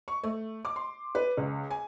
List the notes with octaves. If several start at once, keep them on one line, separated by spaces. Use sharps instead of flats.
C#6
A3
D6
C6
B4
C#2
G#5